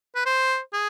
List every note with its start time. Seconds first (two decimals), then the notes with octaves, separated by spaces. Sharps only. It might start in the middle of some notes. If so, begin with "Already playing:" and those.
0.15 B4
0.26 C5
0.73 G#4